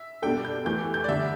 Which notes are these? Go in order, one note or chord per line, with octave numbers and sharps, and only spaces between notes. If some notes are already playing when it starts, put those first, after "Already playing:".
Already playing: E5
B2 G3 D4 A4 G5
G6
E3 A3 G4 G6
G6
D5
D3 G3 D4 E5